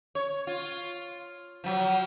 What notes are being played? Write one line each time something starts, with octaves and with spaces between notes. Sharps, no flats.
C#5
F4
F3 F#3